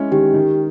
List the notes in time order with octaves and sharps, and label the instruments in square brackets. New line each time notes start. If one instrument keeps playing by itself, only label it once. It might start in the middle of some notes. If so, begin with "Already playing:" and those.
Already playing: [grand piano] G#3 C#4 E4
[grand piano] D#3 [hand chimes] G4
[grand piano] D#3